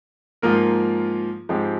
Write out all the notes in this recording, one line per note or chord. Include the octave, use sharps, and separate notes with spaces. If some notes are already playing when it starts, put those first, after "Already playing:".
G#2 F3 A#3 F4 A#4
G#2 F3 G#3 C4 G4